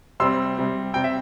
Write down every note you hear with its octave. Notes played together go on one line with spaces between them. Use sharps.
C3 G3 C4 C6 E6
C3 G3 C4
C3 G3 C4 G5
E5